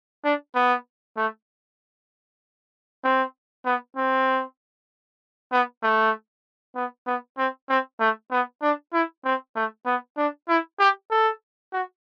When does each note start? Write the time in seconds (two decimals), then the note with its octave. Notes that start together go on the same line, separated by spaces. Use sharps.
0.24 D4
0.55 B3
1.17 A3
3.04 C4
3.65 B3
3.97 C4
5.52 B3
5.83 A3
6.76 B3
7.07 B3
7.38 C4
7.69 C4
8.00 A3
8.31 B3
8.62 D4
8.93 E4
9.25 C4
9.55 A3
9.86 B3
10.17 D4
10.49 E4
10.79 G4
11.11 A4
11.73 F#4